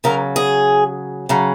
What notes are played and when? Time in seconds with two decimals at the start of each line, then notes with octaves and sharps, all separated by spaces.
0.04 C#3 F#3 A#4
0.36 G#4
1.29 C#3 F#3